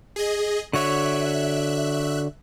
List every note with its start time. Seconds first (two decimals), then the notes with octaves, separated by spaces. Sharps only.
0.16 G#4 D#5
0.73 D3 F#4 C#5 E5 F#6